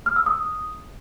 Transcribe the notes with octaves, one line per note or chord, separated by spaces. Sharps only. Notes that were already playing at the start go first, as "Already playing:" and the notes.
F6
E6
D#6